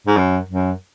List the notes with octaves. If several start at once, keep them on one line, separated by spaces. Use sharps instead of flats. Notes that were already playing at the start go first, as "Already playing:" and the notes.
G#2
F#2
F#2